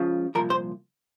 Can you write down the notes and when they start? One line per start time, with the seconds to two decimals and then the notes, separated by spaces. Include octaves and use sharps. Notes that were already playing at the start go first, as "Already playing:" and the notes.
Already playing: C#2 C#3 F3
0.35 C2 A#2 F3 A#4
0.50 C5